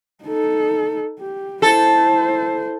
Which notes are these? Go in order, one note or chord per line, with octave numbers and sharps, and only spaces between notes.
D#4 A4
G4
E4 A4 C5